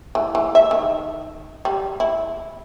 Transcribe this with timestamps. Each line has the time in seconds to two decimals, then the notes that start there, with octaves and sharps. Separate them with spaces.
0.15 E3
0.35 E3
0.55 E5
0.71 D#3
1.65 G3
2.00 E4